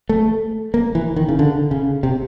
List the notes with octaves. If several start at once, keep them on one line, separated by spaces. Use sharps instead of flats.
A3
A#3
E3
D#3
C#3
D3
C#3
C3